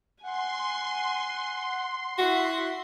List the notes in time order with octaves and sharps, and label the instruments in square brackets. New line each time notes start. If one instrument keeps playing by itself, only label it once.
[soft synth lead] F#5 [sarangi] G#5 [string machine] C6
[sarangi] E4 [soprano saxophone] F#4 [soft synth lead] F#6